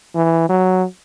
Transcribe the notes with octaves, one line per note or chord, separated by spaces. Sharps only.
E3
F#3